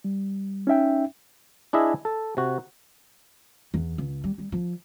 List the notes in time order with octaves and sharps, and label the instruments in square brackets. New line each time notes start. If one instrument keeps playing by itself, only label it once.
[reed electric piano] G3
C#4 D#4 E5 G5
[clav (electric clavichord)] D4 E4 G#4 D#5 E5
A4
C3 F#4
[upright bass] E2
C#2
G3
G3
F3